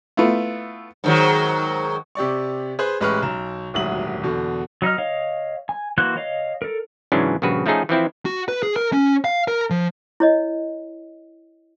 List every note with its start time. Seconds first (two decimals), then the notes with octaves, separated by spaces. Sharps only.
0.17 A3 B3 E4 F4
1.04 G#2 D#3 F#3
2.15 C3 G4 D5 C#6
2.79 G#4 B4 C5 G#5 C6 F#6
3.00 A1 G#3 G4 B4 C#6 F6
3.22 B1 A#5 E7
3.74 D#1 G#1 D2 F#3 D#6 F#7
4.23 E2 B2 D3
4.82 F#3 D#4 D#5 F6
4.98 C#5 D#5 F5
5.69 G#5
5.98 E3 A#3 F#4 C5 F#6
6.17 C#5 D#5 F5
6.62 A4 A#4
7.12 G#2 C#3 E3 F#3 C#4 D4
7.42 A#1 G2 C#3 F#4 B4
7.66 F3 A3 C#4 D#4 G#4 A4
7.89 E3 F3 C4 E4
8.25 F#4
8.48 B4
8.63 G#4
8.76 A#4
8.93 C#4
9.24 F5
9.48 A#4
9.70 F3
10.20 E4 C#5 D#5